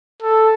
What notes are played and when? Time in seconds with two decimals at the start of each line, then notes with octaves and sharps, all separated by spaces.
0.22 A4